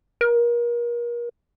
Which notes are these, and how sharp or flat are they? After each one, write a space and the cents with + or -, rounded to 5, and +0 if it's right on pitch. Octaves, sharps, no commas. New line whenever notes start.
A#4 +35